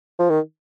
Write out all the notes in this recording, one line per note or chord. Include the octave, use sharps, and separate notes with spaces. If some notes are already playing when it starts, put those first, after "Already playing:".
F3
D#3